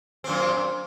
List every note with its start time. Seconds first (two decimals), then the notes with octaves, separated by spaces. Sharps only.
0.24 C4
0.27 A#2
0.29 F#2